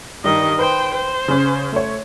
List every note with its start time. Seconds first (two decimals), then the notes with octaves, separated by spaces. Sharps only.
0.24 G2 D#3 D#5
0.59 B4 C5 G5
0.94 C5
1.28 C#3 C#4
1.72 A3 C#5